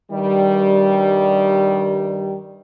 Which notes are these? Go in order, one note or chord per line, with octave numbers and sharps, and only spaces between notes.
G2 D#3 G3